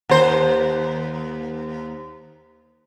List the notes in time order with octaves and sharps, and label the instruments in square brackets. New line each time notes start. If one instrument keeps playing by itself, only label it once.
[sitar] D#2 C5